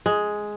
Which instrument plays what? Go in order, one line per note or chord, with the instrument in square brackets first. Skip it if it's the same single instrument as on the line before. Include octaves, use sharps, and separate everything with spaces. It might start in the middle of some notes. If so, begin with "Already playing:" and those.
[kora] G#3